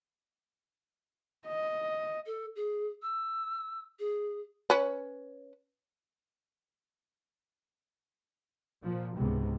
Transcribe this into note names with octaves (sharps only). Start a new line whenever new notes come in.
D#5
A4
G#4
E6
G#4
C#4 B4
A#2 F3
C#2 G#2 C3 B3